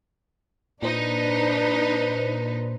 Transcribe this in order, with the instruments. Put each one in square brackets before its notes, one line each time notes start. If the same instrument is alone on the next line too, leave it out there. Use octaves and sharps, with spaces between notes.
[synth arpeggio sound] A#2 C5 [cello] D4 B4 [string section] D#4